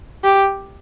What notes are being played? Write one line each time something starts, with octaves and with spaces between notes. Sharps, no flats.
G4